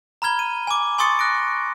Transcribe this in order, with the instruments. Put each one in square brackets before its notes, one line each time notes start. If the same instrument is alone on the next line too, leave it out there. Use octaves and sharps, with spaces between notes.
[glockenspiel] A#5 B5 F6 G#6 G7
D#7
G#5 D6
G#5 C6 C#6 D#6 A6 C#7
F#6 A#6 D7